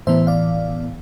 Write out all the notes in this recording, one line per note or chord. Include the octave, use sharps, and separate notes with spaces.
A2 E3 B3 C5 E5
D5 F5